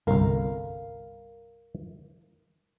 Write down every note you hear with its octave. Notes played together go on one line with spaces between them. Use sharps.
G1 C2 A#4 F5